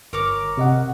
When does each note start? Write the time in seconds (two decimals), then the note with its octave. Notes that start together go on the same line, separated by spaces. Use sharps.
0.13 G1 A#4 C#5 D6
0.57 C3 D#5 F#5